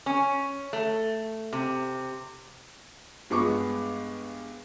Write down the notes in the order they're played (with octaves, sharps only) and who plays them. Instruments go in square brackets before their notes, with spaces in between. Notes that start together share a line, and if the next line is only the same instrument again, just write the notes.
[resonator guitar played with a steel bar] C#4
A3
C3
[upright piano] G2 G#3 B3 C#6 D6